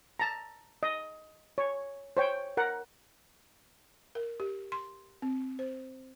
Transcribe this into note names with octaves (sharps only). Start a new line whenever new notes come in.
A5 A#5
D#5
C#5
C5 C#5 G5
A#4 F#5
A#4
G4
C6
C4
C5